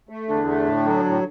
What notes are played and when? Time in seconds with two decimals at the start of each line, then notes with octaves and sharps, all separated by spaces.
0.09 A3
0.28 E2 D3 D4
0.47 A3
0.66 A2
0.85 F#3
1.05 A2